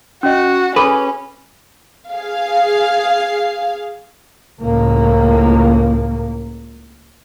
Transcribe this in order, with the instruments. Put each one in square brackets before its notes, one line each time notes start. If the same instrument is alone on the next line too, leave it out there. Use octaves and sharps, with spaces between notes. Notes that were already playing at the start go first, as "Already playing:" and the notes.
[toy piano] C#4 D#5 [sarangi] F#4
[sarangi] C#4 [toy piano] G#4 A4 [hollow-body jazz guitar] B4
[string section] G#4 F5
[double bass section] C#2 A2 A#3